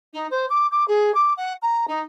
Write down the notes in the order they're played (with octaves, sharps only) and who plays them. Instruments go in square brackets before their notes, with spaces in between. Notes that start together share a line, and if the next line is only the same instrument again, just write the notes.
[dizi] D#4
C5
D6
D6
G#4
D6
F#5
A#5
D#4